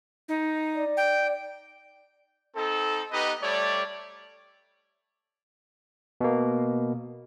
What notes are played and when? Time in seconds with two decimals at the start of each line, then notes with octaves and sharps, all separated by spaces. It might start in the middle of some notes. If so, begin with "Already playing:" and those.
0.28 D#4
0.76 D5
0.97 G5
2.56 C4 D#4 A4
3.12 B3 D#4 G4 B4 D#5
3.42 G3 A3 C#5 D5
6.21 B2 A#3